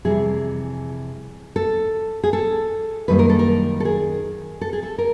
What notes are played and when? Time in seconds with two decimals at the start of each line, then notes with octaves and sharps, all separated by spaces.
0.05 F2 C3 E3 G3 G#4
1.56 A4
2.23 G#4
2.33 A4
3.08 F#2 D#3 G3 A#3 B4
3.19 A#4
3.29 A4
3.39 A#4
3.80 A4
3.85 G#4
4.61 A4
4.73 G#4
4.83 A4
4.98 A#4